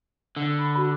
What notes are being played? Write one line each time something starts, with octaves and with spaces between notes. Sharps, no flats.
D3
B5
F#4